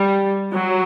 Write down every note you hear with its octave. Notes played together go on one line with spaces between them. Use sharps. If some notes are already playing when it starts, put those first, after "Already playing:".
Already playing: G3
F#3